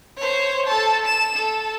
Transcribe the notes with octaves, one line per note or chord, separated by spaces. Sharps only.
C5 C#5
A4 A5
E7
A4